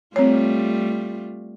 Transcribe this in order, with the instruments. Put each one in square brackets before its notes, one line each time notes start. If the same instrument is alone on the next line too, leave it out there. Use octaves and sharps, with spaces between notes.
[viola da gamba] G3 A3 F4 [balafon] C4 C#5